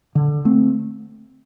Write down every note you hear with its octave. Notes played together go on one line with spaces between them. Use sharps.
D3
A3 C4